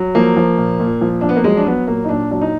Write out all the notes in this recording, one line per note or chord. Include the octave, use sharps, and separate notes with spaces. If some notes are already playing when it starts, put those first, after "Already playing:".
Already playing: F#3
F3 A#3
F3
A#2
A#2
F3
F3 D4
B3
A#3
F#3 G#3
D4
F#3 B3
A#2 A#3
D#4
A#2 D4
F#3 D4
D#4